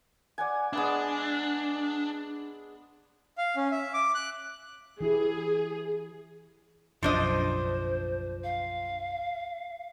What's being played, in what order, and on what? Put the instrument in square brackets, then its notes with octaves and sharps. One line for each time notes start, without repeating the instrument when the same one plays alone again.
[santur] D5 F#5 G#5
[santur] G#3 B3 E5 [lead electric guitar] D4
[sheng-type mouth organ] F5
C#4
E5
D6
F#6
[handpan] E3 E4 G4 [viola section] G#4
[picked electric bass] F#1 B1 [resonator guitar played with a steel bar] F3 D4 D#5 [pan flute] C5
[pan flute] F5